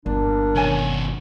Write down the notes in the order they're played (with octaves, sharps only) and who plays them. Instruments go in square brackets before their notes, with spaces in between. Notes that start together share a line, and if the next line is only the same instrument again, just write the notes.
[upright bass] G1 [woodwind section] A#2 G3 D4
[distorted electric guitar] B2 D#3 [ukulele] C#5 G#5 A5